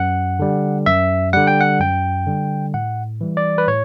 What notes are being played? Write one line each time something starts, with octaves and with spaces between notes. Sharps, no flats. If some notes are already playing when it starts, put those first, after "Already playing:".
Already playing: F#2 F#5
D3 G3
F#2 E5
D3 G3 F#5
G5
F#5
F#2 G5
D3 G3
A2 F#5
E3 G3
D5
B4
A2 C#5